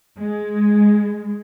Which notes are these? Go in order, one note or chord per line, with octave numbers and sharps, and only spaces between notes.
G#3